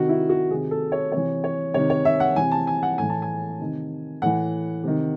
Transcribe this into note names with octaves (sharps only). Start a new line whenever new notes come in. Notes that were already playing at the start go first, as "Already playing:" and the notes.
Already playing: C3 D#3 F#4
E4
F#4
C3 D#3 G#4
A4
C#5
C3 E3 C#5
C#5
C3 D#3 C#5
C#5
E5
F#5
C3 E3 G#5
A5
G#5
F#5
A2 E3 G#5
A5
G#5
C3 D#3
A2 E3 F#5
C3 D#3